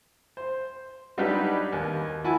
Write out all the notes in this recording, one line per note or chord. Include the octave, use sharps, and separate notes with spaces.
C5
F#3 G3 D4 D#4 G4 B4
D#2
E4 F#4 G#5 A5